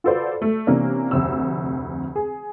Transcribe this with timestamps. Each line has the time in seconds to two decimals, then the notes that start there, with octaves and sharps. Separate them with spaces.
0.04 F4 F#4 A4 B4 C5 D5
0.42 A3
0.67 C3 E3 A#3 C#4 D4
1.11 F1 D2 E6
2.16 G#4